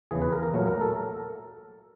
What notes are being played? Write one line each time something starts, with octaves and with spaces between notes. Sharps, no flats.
E2 C#3 E3 G#4
B4
A#4
A#4
A#2 F#3 A3
A#4
A4